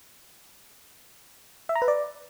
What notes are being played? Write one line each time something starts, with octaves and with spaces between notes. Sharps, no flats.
E5
A#5
B4
D5